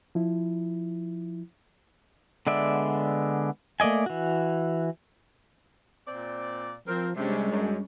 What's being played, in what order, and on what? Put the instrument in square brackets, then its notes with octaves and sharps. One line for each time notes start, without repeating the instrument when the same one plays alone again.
[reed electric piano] F3 E4
[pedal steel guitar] D3 G#3 B3 D5 E5
A3 A#3 D5 D#5 G#5
E3 F#4
[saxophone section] A#2 C4 D5
[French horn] F3 [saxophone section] C4 A#4
[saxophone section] C3 [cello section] G3 C#4 D4 [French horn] G#3
[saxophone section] F#2